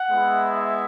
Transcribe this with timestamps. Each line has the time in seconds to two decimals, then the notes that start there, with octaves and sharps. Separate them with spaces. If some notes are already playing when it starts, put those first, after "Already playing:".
Already playing: F#5
0.11 G#3 B3 E4
0.56 E5